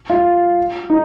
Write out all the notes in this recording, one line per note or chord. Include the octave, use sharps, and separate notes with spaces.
F4
D#4